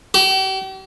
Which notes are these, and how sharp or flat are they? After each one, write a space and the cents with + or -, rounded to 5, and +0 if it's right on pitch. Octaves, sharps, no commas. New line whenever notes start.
G4 -40